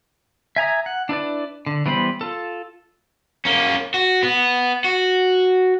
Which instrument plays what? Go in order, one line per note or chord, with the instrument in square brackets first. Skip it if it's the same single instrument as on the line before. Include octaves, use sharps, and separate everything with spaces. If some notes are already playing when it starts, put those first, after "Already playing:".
[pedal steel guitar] E5 G#5 A#5 D#6
F#5
D4 E4 B4 D5
D3
E3 G3 B3 C5 B5
F4 A4
[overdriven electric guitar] A#3 C#4
F#4
B3
F#4